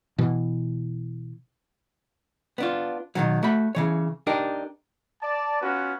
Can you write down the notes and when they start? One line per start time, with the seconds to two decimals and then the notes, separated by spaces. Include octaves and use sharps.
0.18 B2 E3
2.58 B3 D4 F4
3.15 B2 D#3 F#3
3.43 A3 F#4 B5
3.75 C#3 E3 C#5
4.27 D4 D#4 G4 A#4
5.21 D5 A5
5.61 B3 C#4 F4 F#4 B4